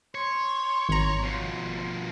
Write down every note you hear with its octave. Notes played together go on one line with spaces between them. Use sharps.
C#5 C6
G#1 A#5
B2 F3